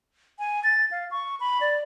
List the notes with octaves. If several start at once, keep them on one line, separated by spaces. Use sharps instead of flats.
G#5
A6
F5
C#6
B5
D5